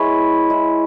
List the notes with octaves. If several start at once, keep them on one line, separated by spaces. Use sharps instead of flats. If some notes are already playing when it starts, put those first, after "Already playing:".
Already playing: G#3 E4 B4 C#5
G#3 E4